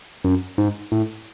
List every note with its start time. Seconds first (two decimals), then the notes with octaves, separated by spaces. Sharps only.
0.24 F#2
0.58 G#2
0.92 A2